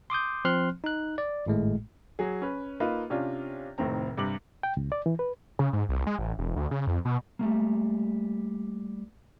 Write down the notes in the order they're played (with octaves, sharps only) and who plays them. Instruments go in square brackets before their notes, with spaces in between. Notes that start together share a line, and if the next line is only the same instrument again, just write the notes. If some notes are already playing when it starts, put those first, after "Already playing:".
[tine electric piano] C6 D6 D#6 G6
F3 C4 C6 F6 F#6
D#4 F#6
D5
G#1 A2 G#3 A3
[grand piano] F#3 G#4
C#4 B4
A#3 D#4 F4 B4
C3 C#4 D4 F4
F1 A2 D#3 C4 A#5
G2 C3 D6 F#7
[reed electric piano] G5
C#2
D5
E3
B4
[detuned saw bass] C#3
G#2
C2
G#3
A1
E1
D2
C#3
F2
B2
[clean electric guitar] G3 A3 A#3